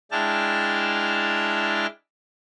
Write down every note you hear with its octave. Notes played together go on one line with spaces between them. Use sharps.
G#3 D4 E4 G5 A5 F6